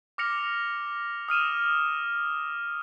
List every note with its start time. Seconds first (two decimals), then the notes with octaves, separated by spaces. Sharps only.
0.18 D6 F6 A#6 C#7 F7
1.28 D#6 F6 D#7 E7